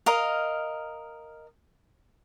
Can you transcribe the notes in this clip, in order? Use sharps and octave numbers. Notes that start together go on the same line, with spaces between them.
A#4 D#5 F5